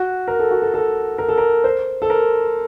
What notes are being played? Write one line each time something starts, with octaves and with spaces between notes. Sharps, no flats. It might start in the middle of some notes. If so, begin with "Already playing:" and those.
Already playing: F#4
A#4
A4
F#4
A4
A4
A#4
A4
A#4
C5
A4
A#4